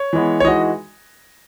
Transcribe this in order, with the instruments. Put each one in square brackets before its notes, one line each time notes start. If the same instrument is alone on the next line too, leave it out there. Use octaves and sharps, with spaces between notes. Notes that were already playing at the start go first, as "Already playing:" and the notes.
Already playing: [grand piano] C#5
[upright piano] E3 G#3 B3
[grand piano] C#5
[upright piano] E3 G#3 D#4 F#4 [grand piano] D#5